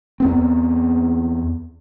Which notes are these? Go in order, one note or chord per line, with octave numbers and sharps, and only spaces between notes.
E2 B3 C4